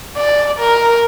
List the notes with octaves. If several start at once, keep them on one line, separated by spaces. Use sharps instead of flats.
D5
A#4